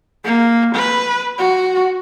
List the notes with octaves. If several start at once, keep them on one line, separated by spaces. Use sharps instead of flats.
A#3
B4
F#4